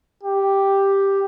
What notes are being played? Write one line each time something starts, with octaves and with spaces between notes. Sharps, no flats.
G4